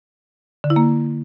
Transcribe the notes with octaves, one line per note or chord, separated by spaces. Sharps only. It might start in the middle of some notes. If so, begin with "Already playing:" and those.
D3
E4
A#3